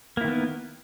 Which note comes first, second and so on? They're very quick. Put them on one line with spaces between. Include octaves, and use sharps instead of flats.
A#3 E4 D#3 B3